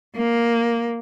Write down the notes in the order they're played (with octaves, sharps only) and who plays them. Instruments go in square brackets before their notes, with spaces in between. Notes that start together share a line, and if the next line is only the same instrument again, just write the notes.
[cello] A#3